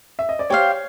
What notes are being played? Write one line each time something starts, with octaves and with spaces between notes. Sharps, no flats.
E5
D#5
D5
G4 C5 C#5 F5